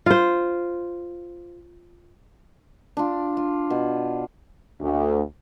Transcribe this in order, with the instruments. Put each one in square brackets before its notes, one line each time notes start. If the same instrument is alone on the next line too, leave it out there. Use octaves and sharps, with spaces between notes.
[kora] F4 C5
[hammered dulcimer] D4 F4
F4
B2
[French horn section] D2